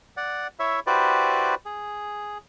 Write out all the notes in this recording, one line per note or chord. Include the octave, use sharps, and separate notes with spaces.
D5 F#5
E4 C#5 E5
E4 F#4 G4 B4 C5 D5
G#4